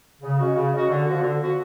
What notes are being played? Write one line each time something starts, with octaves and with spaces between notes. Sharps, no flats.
C#3
G#3 C#4 F#4
C#3
G#3 C#4 F#4
D3
F3 B3 F#4
D3
F3 B3 F#4